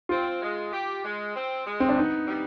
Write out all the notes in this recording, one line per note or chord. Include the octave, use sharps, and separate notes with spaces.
C4 F4
G#3
G4
G#3
C4
G#3
C4
D4
B3 D#4
G3